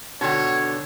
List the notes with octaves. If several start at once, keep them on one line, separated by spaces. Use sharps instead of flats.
B2 D3 D#4 F#4 C#5 G5